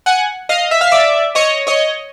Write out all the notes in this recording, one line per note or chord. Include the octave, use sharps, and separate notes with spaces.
F#5 G#5
D#5 F5
E5
F5
D5 E5
C#5 D#5
C#5 D#5